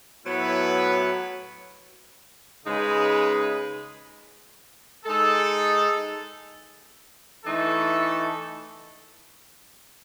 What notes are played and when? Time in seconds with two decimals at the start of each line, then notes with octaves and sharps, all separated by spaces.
0.24 A2 F#3 B3 E4 B4
2.64 C#3 G#3 D#4 G#4 B4
5.05 G#3 D#4 A4
7.45 E3 A3 D#4 A4